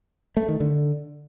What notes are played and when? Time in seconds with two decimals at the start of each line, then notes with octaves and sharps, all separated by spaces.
0.37 A3
0.48 D#3
0.60 D3